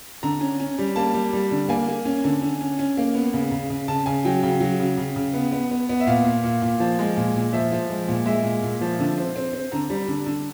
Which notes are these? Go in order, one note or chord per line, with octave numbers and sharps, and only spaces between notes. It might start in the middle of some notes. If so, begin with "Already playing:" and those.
D3 A#5
C#4
C#4
G3
A#3 A5
G3
G3
D3
A#3 G#5
A#3
C#4
D3
D3
C#4
C#4
A#3
B3
C#3
C#3
C#3
C#3 A5
C#3 G#5
F#3 G5
C#3 G5
F#3
C#3
C#3
C#3
B3
B3
B3
B3
E5
A#2 F5
A#2
A#2
A#2
F3
G#3
A#2
A#2
F3 E5
F3
G#3
A#2
G#3 E5
A#2
A#2
F3
D3
C4
C4
C4
D3 A#5
G3
D3
D3